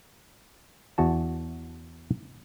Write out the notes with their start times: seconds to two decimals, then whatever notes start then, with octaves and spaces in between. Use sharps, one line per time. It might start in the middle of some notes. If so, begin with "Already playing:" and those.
0.98 E2 F#4 A5